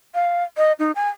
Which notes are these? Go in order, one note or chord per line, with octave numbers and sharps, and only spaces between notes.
F5
D#5
D#4
G#5